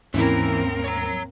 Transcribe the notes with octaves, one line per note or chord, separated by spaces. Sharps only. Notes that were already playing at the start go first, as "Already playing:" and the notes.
D#2 G#2 E3 A#3 C4 C#4 E4 A#4
C#5 A#5